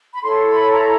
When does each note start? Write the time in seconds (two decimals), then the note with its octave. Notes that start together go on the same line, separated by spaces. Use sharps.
0.13 B5
0.22 E4 A4 C#5 C6
0.48 B5
0.72 A#5